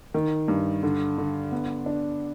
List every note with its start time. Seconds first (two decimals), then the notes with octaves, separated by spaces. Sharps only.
0.14 D#3
0.48 G2
0.83 D3
1.18 D3
1.52 B3
1.86 D4